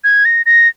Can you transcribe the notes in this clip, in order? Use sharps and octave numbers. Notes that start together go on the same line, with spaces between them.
G#6
A#6
A#6